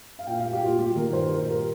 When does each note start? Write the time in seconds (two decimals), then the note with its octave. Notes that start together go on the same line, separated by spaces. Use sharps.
0.19 F5
0.27 A#2 G5
0.39 F5
0.44 G3
0.53 G4
0.61 A#2 F4
0.79 G3 G4
0.96 D#3 A#4
1.13 G2 C5
1.31 A#2 A#4
1.48 G3 A#4